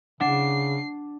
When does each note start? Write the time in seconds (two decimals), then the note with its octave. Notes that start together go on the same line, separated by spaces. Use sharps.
0.21 C#3 D4 F#5 C7